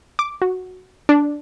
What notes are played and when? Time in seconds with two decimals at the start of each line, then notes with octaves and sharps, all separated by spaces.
0.19 D6
0.42 F#4
1.09 D4